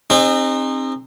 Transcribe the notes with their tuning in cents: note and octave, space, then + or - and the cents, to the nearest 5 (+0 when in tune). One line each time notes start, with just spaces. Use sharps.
C4 +20 D#4 -25 G#4 -35